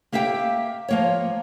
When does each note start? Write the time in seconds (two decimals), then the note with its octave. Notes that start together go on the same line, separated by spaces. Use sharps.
0.12 A#3 G4 E5 F5 G5
0.88 F3 A#3 C#5